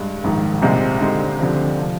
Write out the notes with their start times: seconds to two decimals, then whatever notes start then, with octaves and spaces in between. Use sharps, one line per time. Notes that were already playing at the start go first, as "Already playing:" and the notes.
Already playing: G2 G#3
0.24 A#1 G#2 D#3
0.62 C2 A#2 G#3 C4 G4
1.01 D3 G#3 D#4 G4 C5
1.39 D2 D3 F3 C4 G4
1.78 C3 F3